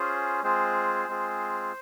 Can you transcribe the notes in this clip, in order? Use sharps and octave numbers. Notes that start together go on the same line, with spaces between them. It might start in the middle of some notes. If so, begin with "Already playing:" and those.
Already playing: C#4 F4 G#4 C5
G#3 C4 F4 G#4 C5
G#3 C4 F4 G#4